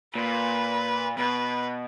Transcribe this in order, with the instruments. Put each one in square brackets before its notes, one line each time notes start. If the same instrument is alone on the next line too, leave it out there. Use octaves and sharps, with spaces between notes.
[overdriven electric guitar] A#2 [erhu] B4
[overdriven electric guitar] B2 [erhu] B4